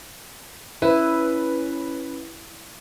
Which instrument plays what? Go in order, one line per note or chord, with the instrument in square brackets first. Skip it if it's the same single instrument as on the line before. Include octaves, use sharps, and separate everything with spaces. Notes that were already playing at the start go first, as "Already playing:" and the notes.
[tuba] C#4 [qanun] E4 [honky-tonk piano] B4